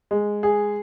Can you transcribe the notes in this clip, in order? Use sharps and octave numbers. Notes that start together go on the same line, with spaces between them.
G#3
G#4